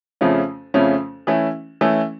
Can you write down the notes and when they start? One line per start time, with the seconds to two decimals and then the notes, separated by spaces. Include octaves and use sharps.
0.21 F2 C#3 F3 A3 C#4
0.74 F2 C#3 F3 A3 C#4
1.27 E3 A3 C#4 E4
1.81 E3 A3 C#4 E4